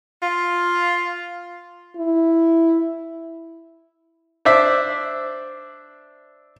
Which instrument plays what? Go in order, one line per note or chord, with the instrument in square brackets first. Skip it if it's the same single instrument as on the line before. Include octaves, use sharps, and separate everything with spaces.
[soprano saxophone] F4
[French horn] E4
[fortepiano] D4 C5 D5 E5